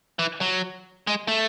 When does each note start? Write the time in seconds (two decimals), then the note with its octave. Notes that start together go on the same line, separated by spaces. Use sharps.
0.19 E3
0.41 F#3
1.07 G#3
1.28 A3